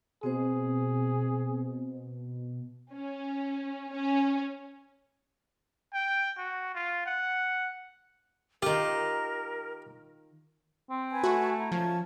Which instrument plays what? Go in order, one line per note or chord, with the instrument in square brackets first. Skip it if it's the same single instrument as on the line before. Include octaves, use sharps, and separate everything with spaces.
[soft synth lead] B2 [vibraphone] C4 C5 [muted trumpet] G#4
[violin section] C#4
C#4
[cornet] G5
F#4
F4
F#5
[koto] D#3 F4 [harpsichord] G4 [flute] A#4
[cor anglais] C4
[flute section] B4 G#5 A5
[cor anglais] A3 [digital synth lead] F#4
[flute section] E4 A#5
[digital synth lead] F3 [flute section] C#4 A5 G#6